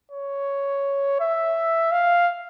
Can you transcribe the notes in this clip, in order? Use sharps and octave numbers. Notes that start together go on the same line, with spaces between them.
C#5
E5
F5